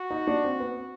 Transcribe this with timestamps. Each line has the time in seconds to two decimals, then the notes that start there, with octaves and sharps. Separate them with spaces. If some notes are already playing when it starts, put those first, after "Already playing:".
Already playing: F#4
0.11 D#4
0.27 D4
0.44 C4
0.60 B3